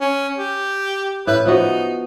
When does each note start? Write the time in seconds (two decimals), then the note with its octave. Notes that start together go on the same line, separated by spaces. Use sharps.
0.01 C#4
0.37 G4
1.27 A2 B4
1.45 F3 B3 D#4 F#4